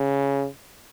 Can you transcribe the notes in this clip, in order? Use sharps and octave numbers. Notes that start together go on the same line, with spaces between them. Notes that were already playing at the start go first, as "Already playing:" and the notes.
Already playing: C#3